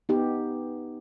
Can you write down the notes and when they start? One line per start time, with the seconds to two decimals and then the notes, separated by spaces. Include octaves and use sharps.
0.09 B3 D#4 G4